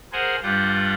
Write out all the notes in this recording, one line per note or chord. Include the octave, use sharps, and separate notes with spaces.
G#4 A#4 C5 F#5 G#5
G2 G3 F4 F#5 G6